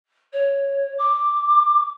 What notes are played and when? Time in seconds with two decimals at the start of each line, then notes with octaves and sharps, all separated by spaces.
0.32 C#5
0.98 D6